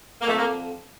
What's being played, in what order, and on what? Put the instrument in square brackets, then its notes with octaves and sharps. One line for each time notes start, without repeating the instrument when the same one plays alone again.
[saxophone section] A#3
[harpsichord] F2 D3 F3 [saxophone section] A3
[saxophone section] A#3